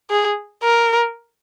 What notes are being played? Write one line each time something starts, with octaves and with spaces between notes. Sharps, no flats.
G#4
A#4